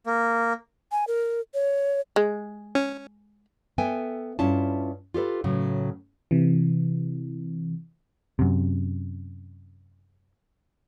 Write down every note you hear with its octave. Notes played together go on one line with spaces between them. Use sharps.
A#3
G#5
A#4
C#5
G#3
C#4
B3 A4 E5 G5 G#5
G2 C#4 E4 F4 A5
F4 G4 A4 B4
A2 C#3 F#3
C3 E3
F#2 C3